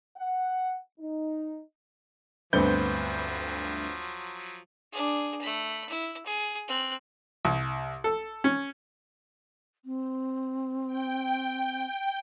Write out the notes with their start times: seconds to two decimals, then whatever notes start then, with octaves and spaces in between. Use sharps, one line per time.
0.17 F#5
0.99 D#4
2.53 D2 G2 F3 F#3 B3 C4 G6
4.92 D4 G#4
5.41 A3 B5
5.89 E4
6.26 G#4
6.68 C4 F#6
7.45 C2
8.04 A4
8.44 C#4
9.85 C4
10.87 G5